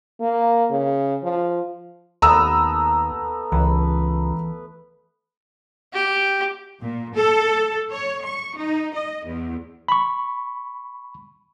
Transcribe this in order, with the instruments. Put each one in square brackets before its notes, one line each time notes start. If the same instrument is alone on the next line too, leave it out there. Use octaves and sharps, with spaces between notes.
[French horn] A#3
C#3
F3
[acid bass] D#2 [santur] A3 B3 [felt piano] A#5 D#6 E6
[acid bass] C#2 [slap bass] E3 [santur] B4
[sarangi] G4
[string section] A#2
A4
C#5
C#6
D#4
D#5
E2
[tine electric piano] B5 C#6